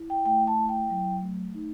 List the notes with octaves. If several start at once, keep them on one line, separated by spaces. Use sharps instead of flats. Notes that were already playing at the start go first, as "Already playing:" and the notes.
Already playing: E4
G5
A3 G5
A5
E4
G5
F#3
A3
D#4